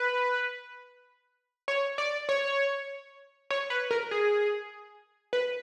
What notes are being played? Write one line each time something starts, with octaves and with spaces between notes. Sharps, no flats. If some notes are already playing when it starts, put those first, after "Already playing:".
Already playing: B4
C#5
D5
C#5
C#5
B4
A#4
G#4
B4